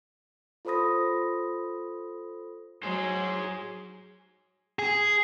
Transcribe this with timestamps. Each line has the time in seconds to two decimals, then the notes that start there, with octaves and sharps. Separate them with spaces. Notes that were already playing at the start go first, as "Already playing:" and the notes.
0.65 F4 A4 C5 B5 D#6 A#6
2.83 F#3 G#4 C5
4.79 G#4